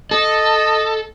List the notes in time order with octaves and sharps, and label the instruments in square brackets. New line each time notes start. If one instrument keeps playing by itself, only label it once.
[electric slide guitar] A4 [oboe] D#5